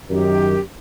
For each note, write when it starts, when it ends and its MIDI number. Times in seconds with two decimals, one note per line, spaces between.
0.10 0.57 42
0.10 0.57 51
0.10 0.60 67